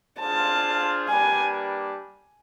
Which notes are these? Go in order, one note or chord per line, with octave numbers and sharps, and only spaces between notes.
D4 F4 G#4 C5 F5 A5
G3 A#3 D4 G4 B4 G#5